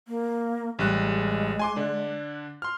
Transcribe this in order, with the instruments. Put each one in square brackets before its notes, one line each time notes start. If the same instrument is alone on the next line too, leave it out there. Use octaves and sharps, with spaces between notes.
[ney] A#3
[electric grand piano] A1 G3 F#6 [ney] G#3
[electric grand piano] G#5 C6 D6
D3 D4
C6 F6